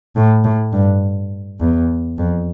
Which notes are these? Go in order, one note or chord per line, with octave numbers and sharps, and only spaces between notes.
A2
A2
G2
E2
F2